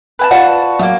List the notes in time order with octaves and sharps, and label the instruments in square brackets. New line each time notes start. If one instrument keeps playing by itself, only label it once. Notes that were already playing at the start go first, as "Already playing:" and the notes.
[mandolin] B4 G#5 A5
[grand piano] F4 D5 F5 [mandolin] F#4 B4 A5
[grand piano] F#3 [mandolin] A3 A#3